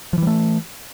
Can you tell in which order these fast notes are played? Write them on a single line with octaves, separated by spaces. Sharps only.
F3 E3 G3 A3